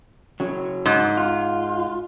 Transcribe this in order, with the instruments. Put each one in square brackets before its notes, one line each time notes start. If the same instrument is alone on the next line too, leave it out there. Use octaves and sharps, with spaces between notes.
[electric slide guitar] C#3 F#3
[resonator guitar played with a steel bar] G#2
[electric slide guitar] F4